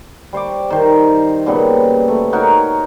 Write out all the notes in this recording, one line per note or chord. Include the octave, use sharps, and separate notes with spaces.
G3 C5 C#6 D6
D#3 C5
A#2 C#3 G3 B3
A3
D#4 F#4 A#4 C#5